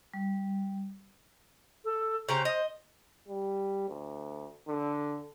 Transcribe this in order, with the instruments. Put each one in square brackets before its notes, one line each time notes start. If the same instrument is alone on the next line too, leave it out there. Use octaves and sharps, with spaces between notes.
[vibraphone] G3
[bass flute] A4
[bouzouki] C#3 G4 A#5 [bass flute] C5
[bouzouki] D#5
[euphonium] G3
D2
D3